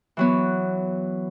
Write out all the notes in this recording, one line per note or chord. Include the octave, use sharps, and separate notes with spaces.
E3 F#3 B3